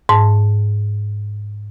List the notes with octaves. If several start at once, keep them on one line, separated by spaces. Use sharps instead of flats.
G#2 A5